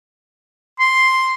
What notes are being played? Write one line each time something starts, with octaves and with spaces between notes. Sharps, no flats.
C6